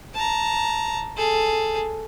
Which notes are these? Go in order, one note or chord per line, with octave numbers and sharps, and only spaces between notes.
A5 A#5
G#4 A4